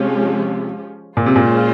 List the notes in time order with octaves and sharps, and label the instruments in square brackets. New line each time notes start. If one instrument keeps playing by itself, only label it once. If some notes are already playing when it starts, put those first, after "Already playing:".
Already playing: [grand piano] C3 [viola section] F3 G#3 C#4 G4
[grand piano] A#2 [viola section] G#3 C#4 F4 C5
[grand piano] C3
A#2